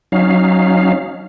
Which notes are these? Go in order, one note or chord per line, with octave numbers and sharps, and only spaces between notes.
F#3 C#4 D#4 F5